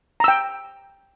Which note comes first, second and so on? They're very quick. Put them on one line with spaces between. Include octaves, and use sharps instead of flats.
A#5 E6 G5